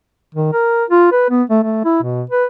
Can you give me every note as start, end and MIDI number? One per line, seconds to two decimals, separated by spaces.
0.34 0.51 51
0.53 0.84 70
0.90 1.09 65
1.12 1.26 71
1.30 1.43 59
1.50 1.61 57
1.63 1.82 57
1.84 1.99 64
2.03 2.23 47
2.30 2.45 71